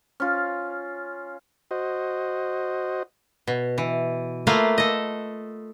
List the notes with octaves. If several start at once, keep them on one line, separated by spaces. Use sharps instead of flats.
C#4 F4
F#4 C5 D#5
B2
E3
A3 A#3 F4 B4 F5
A4 D#5